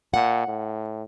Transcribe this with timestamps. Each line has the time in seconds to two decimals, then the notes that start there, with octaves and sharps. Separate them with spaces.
0.14 A#2 F#5
0.48 A2